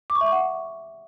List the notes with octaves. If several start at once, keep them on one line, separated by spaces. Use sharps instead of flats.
D6
C#6
E5
C#6
F#5